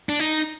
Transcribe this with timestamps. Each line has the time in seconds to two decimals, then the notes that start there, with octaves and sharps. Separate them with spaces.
0.09 D4
0.20 D#4